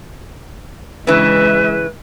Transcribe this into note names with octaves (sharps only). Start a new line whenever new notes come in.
C#3 E3 G#3 B4 E5